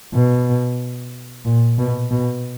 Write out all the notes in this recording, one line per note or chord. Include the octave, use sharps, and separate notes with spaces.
B2
A#2
B2
B2